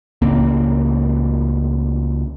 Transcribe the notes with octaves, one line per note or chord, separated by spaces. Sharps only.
C#2 A2 A#3 C4